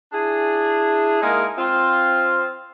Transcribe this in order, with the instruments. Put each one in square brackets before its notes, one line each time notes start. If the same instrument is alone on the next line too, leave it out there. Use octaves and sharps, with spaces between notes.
[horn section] D4 E4 G#4
G#3 A#3 D#4 E4 A#4
C4 F4